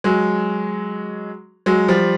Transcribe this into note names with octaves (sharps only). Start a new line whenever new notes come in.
F#3 G#3
F#3 G#3
F3 G3